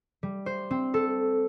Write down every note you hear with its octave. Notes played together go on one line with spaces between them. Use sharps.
G3
C5
C4
A4